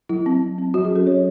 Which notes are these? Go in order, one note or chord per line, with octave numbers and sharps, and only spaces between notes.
F#3 E4
C4
F#3
C4
F#3 F#4
G#4
C#4
A4
F#3 C#5